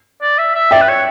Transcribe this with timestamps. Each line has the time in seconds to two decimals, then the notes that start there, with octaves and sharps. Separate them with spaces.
0.21 D5
0.38 E5
0.54 E5
0.71 D5 E5 G5
0.81 B4
0.88 C#5